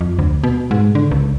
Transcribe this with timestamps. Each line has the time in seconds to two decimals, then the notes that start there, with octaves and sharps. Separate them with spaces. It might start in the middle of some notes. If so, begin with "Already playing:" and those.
0.01 F2
0.19 D2
0.44 B2
0.71 G#2
0.95 D3
1.11 C#2